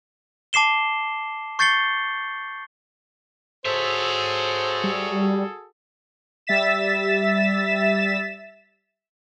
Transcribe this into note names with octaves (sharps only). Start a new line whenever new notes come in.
A5 D6 C7 E7 G7
C#6 G6 A6 C7 C#7 G7
F#4 G#4 A4 C5 C#5 E5
G3
G3 E5 A6 B6 E7